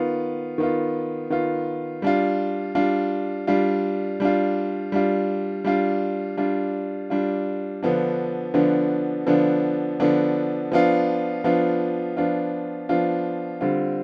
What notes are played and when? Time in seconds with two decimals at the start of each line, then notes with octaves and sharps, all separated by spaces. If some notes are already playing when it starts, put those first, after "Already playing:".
Already playing: D#3 B3 F4
0.58 D#3 B3 F4
1.30 D#3 B3 F4
2.02 G3 D4 F4
2.75 G3 D4 F4
3.47 G3 D4 F4
4.20 G3 D4 F4
4.92 G3 D4 F4
5.64 G3 D4 F4
6.37 G3 D4 F4
7.10 G3 D4 F4
7.83 D3 F3 B3 D4
8.54 D3 F3 B3 D4
9.27 D3 F3 B3 D4
10.00 D3 F3 B3 D4
10.72 F3 B3 D4 F4
11.44 F3 B3 D4 F4
12.17 F3 B3 D4 F4
12.89 F3 B3 D4 F4
13.61 D3 G3 C4 F4